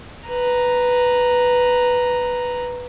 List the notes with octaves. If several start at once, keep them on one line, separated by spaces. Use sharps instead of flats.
B4 A#5